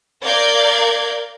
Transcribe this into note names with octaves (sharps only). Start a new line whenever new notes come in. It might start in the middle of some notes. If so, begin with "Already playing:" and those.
A#4 D5 F5 G6 G#6